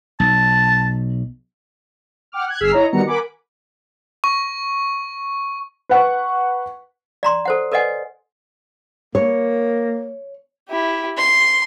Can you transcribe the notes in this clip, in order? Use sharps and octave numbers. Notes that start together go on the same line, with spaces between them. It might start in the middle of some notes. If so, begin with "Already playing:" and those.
B1 A5
F#5 G5 D6 F6
F#6 G#6
G1 G#4 E6 F6 B6 C7
E4 C#5 D#5 A#5
D#3 G3 B3 F#4 A#5 C#7
A#4 F#5 G#5 B5 D6
C#6
B4 F#5 C#6
D5 A#5 C6
A4 C5 F#5
A4 B4 D5 D#5 F#5 G#5
A#3 C#5
E4 G4
C6